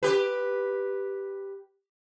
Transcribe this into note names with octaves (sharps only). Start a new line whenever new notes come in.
G4 B4